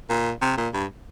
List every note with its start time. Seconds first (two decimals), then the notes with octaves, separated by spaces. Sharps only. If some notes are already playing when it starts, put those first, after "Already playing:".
0.09 A#2
0.42 C3
0.57 A#2
0.74 G2